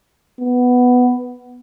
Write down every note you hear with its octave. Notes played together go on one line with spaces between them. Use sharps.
B3